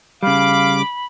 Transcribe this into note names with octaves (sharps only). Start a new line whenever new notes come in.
C#3 G3 F5 B5 D6